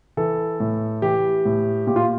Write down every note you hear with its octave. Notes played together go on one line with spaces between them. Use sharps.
E3 A4
A2
E3 G4
A2
A#2 G4
F4